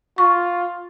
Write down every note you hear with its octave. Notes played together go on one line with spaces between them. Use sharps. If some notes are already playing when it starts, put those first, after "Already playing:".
F4 C#6